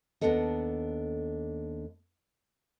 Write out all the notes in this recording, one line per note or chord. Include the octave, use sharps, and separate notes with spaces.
D#2 D#3 B3 D4 A4 D#5